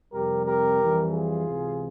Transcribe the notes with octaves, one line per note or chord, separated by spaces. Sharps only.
F2 C3 G3 G4 A#4
G4 A#4
F2 E3 G3
F4 G#4
C#2 C3 E3